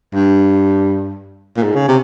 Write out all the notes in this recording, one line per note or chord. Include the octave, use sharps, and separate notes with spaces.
G2
A#2
G#2
C#3
C3